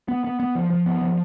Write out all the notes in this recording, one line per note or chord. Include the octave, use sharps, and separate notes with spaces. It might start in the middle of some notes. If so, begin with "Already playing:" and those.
B3
B3
B3
F3
F3
B3
F3